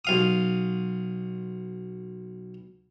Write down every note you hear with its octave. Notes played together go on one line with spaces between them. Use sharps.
B1 F5 D#6